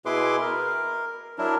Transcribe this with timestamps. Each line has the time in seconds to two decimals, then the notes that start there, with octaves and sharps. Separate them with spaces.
0.06 B2 E4 G#4 B4 C6 D6
0.41 A#4
1.38 F#3 D4 E4 A#4